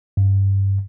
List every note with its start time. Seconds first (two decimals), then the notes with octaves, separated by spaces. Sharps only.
0.17 G2